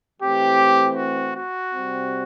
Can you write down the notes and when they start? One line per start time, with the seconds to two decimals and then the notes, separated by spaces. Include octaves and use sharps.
0.20 E3 A3 C4 G4
0.97 F#4
1.36 F#4
1.75 C3 G3 C4